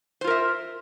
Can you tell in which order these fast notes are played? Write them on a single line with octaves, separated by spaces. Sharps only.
C5 F4 A#4 E5